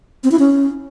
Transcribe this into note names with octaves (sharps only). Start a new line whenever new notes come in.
C4
E4
C#4